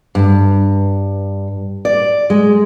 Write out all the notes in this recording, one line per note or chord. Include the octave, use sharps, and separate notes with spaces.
G2
D5
G#3